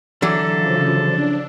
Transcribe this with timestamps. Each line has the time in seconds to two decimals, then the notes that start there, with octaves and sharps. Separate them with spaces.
0.22 D3 E3 F#3 A4
0.55 C#3 F3
1.06 D4